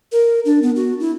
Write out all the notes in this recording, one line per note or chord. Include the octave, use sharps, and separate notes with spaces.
A#4
D4
B3
F#4
E4